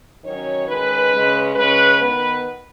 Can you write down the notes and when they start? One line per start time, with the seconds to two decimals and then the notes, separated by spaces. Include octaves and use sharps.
0.24 D#3 F#3 C#4 C#5
0.68 D#3 G#3 C#4 B4
1.12 C#3 G#3 C#4
1.55 C#3 G#3 C#4 B4
1.99 D#3 B3 B4